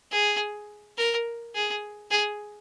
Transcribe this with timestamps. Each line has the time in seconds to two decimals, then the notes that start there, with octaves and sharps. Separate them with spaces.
0.12 G#4
0.98 A#4
1.55 G#4
2.11 G#4